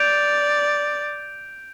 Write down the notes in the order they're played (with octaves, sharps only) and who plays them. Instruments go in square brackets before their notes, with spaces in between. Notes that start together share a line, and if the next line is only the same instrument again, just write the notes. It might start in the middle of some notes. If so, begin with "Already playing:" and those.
Already playing: [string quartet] D5 [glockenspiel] G6 D7 F7